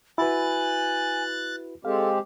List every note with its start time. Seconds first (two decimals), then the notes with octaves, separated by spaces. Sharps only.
0.18 E4 F#4 B4 G#5 F#6 A6
1.85 G#3 C4 G4 A4 F5